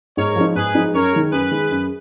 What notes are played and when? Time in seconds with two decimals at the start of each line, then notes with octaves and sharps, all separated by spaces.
0.17 G#2 A#4 C#5
0.36 F3 G#3 D#4
0.55 G#2 G#4 B4
0.75 F3 G#3 D#4
0.94 F#2 A#4 C#5
1.13 D#3 G#3
1.32 F#2 G#4 B4
1.51 D#3 G#3
1.71 F#2